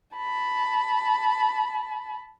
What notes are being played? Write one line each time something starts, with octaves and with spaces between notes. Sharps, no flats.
A5 B5